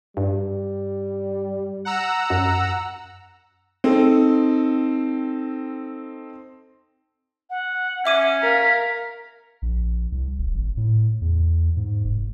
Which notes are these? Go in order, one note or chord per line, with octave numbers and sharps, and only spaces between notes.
G2 G3
F#5 A#5 E6
F#2
C4 D#4 A4
F#5
C#4 E5 D6 D#7
A#4 F5 B6
A#1
C2
D#1
G#1
A2
E2
G#2
F1